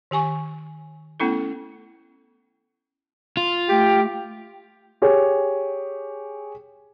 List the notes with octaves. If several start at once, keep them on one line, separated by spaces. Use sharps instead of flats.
D#3 G4 G#5 C#6
A3 B3 C#4 E4 A4
F4
A3 G4 G5
G4 G#4 C#5